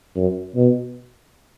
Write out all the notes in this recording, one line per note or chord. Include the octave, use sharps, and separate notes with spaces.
F#2
B2